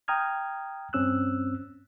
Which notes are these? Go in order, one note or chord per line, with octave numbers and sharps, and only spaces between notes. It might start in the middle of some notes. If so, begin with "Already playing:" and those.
G5 A#5 D#6 F6 G#6
G2 C4 C#4 E6 F#6